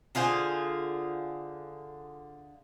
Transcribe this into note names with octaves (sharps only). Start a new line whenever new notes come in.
D3 F4 G#4 C5